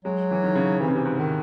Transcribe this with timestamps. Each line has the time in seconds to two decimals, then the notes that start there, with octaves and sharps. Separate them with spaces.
0.05 F#3 G#3
0.31 E3
0.44 D#3
0.55 C#3
0.80 C3 E3
0.88 C#3
0.95 C3
1.05 G#2
1.18 D#3